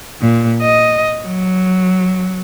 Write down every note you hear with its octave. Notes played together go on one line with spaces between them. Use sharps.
A#2
D#5
F#3